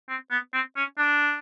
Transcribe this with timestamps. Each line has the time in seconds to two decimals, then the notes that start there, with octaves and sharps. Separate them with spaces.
0.08 C4
0.31 B3
0.53 C4
0.76 C#4
0.98 D4